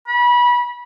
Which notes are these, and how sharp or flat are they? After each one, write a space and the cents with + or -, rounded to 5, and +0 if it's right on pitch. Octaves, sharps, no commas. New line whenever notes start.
B5 -25